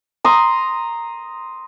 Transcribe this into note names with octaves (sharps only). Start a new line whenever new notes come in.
A#5 C6 D#6